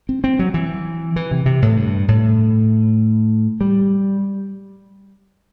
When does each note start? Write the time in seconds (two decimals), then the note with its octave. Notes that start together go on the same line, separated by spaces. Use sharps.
0.09 C4
0.24 C4
0.39 F#3
0.54 E3
1.16 E3
1.31 C3
1.46 C3
1.62 A2
1.77 G2
2.08 A2
3.61 G3